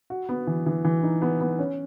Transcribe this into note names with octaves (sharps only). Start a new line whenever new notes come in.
F#4
B3
E3
E3
E3
D#4
B3
B3
C#4